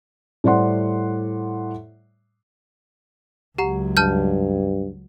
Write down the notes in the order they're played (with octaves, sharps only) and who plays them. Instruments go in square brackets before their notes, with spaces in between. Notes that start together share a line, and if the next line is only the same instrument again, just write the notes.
[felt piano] A2 G3 C5 D5 F#5 C6
[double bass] C#2 F#3 [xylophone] G4 F#5 A#5
[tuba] G2 [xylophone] A5 F6 G6